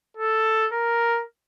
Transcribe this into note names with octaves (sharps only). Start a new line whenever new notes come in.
A4
A#4